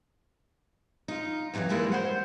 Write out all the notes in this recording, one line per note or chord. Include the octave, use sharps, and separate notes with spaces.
D#4 F4
F2 A2 D#3 E3 F#3
E3 G3 G#3 A#3 E4 G#4
C5 C#5 F#5